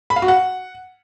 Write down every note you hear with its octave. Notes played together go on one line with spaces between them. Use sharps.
B5
F5
F#4
F#5